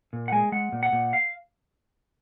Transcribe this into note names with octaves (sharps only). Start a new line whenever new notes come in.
A#2
F#5
G#3 G#5
G#3 F#5
A#2
F#5
A#2
F5